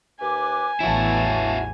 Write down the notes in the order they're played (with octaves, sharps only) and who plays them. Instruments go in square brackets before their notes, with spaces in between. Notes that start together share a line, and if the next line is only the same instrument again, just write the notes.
[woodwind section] D#2 B4 D6 [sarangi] G#5
[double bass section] A1 E2 E3 [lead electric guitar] E4 F#4 [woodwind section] C#5 A5